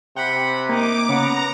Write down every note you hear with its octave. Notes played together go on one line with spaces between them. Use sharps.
C3 F#5 G5 B5
A#3 D#4 D6
C#3 B3 F#5 A#5